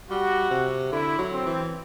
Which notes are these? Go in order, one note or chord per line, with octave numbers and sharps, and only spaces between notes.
G3 F#4
C3
D3 E4
F#3
C4
E3